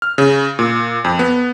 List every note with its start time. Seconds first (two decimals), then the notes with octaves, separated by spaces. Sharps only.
0.02 F6
0.18 C#3
0.59 A#2
1.04 F2
1.19 B3